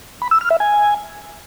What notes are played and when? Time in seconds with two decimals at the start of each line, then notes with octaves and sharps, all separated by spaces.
0.22 B5
0.31 E6
0.41 F6
0.51 E5
0.60 G#5